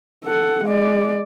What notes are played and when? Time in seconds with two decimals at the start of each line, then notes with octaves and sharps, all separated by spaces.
0.25 A4 F#5
0.64 G#3 D5